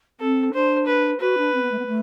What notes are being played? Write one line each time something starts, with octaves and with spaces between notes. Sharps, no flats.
C4 A4
D4 C5
B4
F#4 B4
D4
C4
B3
A3
B3
A3